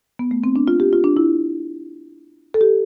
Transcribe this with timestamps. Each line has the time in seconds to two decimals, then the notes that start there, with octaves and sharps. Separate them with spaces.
0.19 B3
0.31 A3
0.44 C4
0.56 D4
0.68 F4
0.80 G4
0.93 F4
1.04 D4
1.17 E4
2.54 A4
2.61 G4